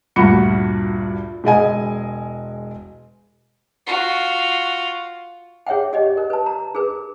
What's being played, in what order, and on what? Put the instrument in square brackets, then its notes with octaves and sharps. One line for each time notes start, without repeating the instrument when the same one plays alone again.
[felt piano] D2 G2 A#2 F#4 B5 C#7
E1 G#3 D#5 G#5
[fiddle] F4 F#4
[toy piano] G#4 C#5 E5 F#5 G5
G4 D5 D#5
A#4
B4 A5
A#5
G#4 A#4 B4